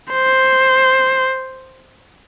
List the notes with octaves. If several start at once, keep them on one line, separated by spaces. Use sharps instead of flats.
C5